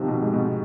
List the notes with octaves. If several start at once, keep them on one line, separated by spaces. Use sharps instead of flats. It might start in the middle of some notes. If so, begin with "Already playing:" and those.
Already playing: C3 D#3 F3
B2
G#2
B2